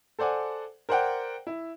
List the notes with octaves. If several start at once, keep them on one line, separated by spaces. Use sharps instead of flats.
A4 C5 D5 F#5 G#5
A#4 C5 D5 F#5 G5
E4